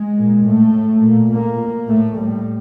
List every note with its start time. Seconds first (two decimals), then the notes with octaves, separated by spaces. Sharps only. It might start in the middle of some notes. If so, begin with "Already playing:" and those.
Already playing: G#3
0.16 A#2
0.45 A2 A3
0.73 A2
1.02 A#2
1.31 A#2 A#3
1.60 A#2
1.88 A2 A3
2.17 A2 G3